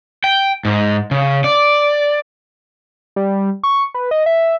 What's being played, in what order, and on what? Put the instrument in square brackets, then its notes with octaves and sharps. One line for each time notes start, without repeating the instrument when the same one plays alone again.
[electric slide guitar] G5
G#2
C#3
D5
[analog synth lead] G3
C#6
B4
D#5
E5